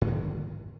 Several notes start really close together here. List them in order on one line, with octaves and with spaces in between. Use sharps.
G#2 G#3 D3 D#3